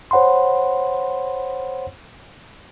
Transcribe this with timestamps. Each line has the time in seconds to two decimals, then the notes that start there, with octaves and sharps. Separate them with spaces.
0.11 C5 C#5 F#5 B5 C6